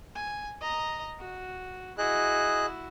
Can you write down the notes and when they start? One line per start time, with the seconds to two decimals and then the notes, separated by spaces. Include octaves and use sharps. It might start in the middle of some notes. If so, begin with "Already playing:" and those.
0.16 G#5
0.61 D#5 A#5
1.19 F#4
1.98 E4 F#4 G#4 D#5 F#6